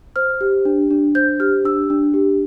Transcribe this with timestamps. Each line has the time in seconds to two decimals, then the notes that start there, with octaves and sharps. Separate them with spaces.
0.16 C5 F6
0.41 G4
0.65 D4
0.91 D4
1.15 C5 G6
1.40 G4 F6
1.65 D4 E6
1.90 D4
2.14 G4